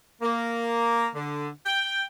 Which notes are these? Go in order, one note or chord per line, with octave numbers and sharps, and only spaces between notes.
A#3
D3
G5